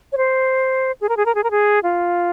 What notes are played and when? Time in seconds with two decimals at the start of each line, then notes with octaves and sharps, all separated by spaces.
0.12 C#5
0.17 C5
1.01 G#4
1.09 A#4
1.17 G#4
1.26 A#4
1.35 G#4
1.44 A#4
1.51 G#4
1.83 F4